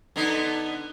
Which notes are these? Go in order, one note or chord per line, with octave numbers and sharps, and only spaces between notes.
D3 B3 D#4